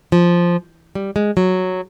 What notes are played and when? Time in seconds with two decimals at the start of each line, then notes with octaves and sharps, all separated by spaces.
0.12 F3
0.95 G3
1.16 G#3
1.37 F#3